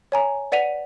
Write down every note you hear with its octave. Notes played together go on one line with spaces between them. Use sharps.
C#5 G#5 A#5
B4 D5 F#5 B6 D#7 F7